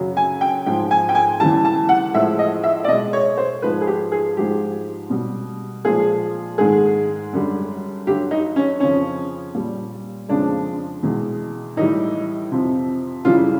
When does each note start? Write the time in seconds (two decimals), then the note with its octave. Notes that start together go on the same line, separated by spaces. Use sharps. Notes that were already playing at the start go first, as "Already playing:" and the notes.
Already playing: F#2 C#3 F#3
0.17 G#5
0.41 G5
0.66 G#2 F3 G#3 G5
0.91 G#5
1.09 G5
1.15 G#5
1.40 E2 C#3 E3 G3 A5
1.65 A5
1.89 F#5
2.14 A2 F3 G#3 E5
2.39 D#5
2.63 E5
2.84 D5
2.88 B2 D#5
2.92 G#3
3.13 C#5
3.38 C5
3.62 G#2 F3 G#3 B4
3.81 G#4
3.87 G4
4.12 G#4
4.37 G#2 F3 G#3 G4
5.10 B2 G3
5.85 A#2 F3 G#3 G#4
6.58 G#2 D#3 G#3 G#4
7.33 F#2 D3 G3
8.07 G2 D3 F#3 G4
8.31 D#4
8.56 C#4
8.80 F2 C#3 F3 C#4
9.54 A#2 G3
10.28 F2 C#3 F3 G#3 D4
11.03 E2 B2 G#3
11.77 A2 E3 G3 D#4
12.51 F2 C3 F3
13.25 F#2 C#3 E3 G3 F4